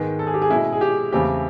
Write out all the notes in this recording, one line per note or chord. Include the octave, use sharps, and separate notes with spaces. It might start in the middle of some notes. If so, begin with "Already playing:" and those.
Already playing: G#2 D#3 G#3 B3
A4
G#4
G4
G#4
B2 G#3 C#4 E4
G#4
G4
E2 C#3 E3 A3 C4 G4